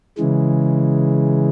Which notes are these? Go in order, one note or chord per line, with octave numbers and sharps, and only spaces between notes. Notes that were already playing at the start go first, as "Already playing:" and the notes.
C#3 E3 G#3